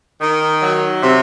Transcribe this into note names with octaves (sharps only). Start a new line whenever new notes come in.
D#3
F#3
C3